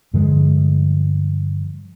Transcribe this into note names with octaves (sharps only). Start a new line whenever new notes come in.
G2 D3 F3 G#3